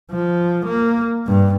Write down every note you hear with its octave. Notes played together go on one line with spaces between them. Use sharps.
F3
A#3
G2